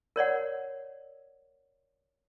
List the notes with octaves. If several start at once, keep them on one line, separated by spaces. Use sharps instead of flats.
A#4 C#5 D5 F#5